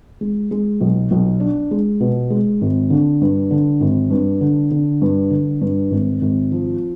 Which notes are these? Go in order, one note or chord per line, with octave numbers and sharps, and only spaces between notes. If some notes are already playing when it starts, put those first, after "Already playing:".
G#3
G#3
B1
B1
D4
G#3
B2
G#3
G#1
D3
G2
D3
G#1
G2
D3
D3
G2
D3
G2
G#1
G#1
F3